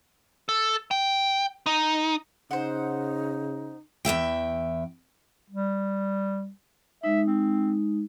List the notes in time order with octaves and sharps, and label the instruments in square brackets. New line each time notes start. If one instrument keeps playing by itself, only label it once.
[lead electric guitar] A4
G5
D#4
[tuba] C#3 [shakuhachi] D#4 [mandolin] C5 F#5
[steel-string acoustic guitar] E2 F#3 E5 G5
[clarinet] G3
[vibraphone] G#3 D#4 [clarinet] E5
[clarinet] C4